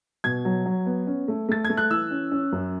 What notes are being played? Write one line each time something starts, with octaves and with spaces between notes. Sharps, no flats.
B2 G#6
F#3
F#3
B3
C#4
A3
A3 A6
A3 G#6
F#6
E3 E6
C#4
C#4
F#2